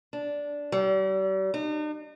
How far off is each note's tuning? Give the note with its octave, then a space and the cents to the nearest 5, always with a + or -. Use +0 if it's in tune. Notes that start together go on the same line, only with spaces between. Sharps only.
D4 -10
G3 -40
D#4 -45